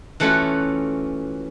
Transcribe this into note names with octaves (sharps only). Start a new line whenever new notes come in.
E3 A3 C#4 F4 F#4